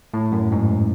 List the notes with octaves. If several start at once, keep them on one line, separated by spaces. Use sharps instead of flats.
A2
F#2
G#2